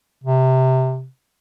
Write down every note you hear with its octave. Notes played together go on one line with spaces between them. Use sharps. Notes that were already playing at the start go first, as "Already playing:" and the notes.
C3